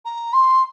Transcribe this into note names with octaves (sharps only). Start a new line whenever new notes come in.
A#5
C6